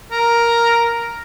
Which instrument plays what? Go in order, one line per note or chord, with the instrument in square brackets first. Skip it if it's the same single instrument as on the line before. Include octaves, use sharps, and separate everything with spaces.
[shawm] A#4